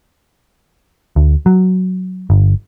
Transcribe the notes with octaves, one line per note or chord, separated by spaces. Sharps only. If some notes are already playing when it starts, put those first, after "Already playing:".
D2
F#3
G1